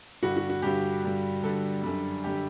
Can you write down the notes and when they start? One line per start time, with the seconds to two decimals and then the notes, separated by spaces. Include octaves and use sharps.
0.23 G2 D3 G3 F#4
0.37 F#4
0.50 F#4
0.62 G2 D3 G3 G4
1.04 G2 D3 G3
1.43 G2 D3 G3 A4
1.83 F#2 D3 G3
2.24 D3 G3 G4